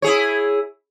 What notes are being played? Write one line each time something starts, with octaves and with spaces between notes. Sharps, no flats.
E4 G#4 C#5